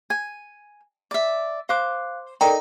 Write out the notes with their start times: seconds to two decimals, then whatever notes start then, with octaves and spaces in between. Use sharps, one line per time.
0.10 G#5
1.11 D5 E5
1.69 C5 F5 D6 F#6
2.41 D#4 A4 A#4 D5 G5 A#5